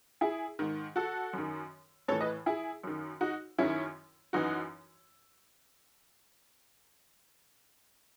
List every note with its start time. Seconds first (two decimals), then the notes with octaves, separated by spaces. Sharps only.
0.21 E4 G#4
0.59 G#2 D#3
0.96 F#4 A4
1.33 F#2 D#3
2.08 A2 A4 C#5
2.12 E3
2.21 B4 D#5
2.46 E4 G#4
2.83 F#2 D#3
3.21 D#4 F#4
3.58 F#2 D#3 C#4 E4
4.33 F#2 E3 D#4 F#4